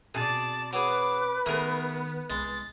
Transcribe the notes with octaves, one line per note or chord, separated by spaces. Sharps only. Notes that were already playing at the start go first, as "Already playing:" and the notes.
B2 C4 G#4 D5 A5
F#3 G#4 B4 D6
D#3 A3 B3 G#4 A#4
C2 G#3 A6